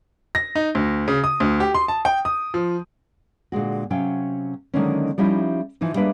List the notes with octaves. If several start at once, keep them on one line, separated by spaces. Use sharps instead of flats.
A#6
D#4
D2
C#3
D#6
D2
G4
C6
A5
G5
D#6
F3
A#2 D3 G#3 F#4
C3 F#3 C#4 F5 G5
D3 D#3 F#3 G#3 A#3 C#4
F3 G3 C#4 D#4 E4
E3 F3 D#4
G3 G#3 A#3 D4 B4 E5